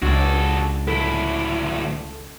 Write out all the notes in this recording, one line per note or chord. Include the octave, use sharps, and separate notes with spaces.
C#2 D4 F#4 A4
D2 E4 A4